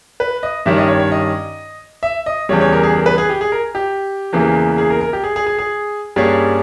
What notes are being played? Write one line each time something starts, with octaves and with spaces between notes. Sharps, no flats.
B4
D#5
G2 D#3 G3 C#4 E5
D#5
C#5
C#5
D#5
E5
D#5
E2 C#3 G3 C#5
C#5
A#4
G#4
A#4
B4
G#4
G4
G#4
A#4
G4
E2 C#3 E3 A#3
G#4
A#4
A#4
G4
G#4
G#4
G#4
G#4
G2 G3 A#3 C#4 G#4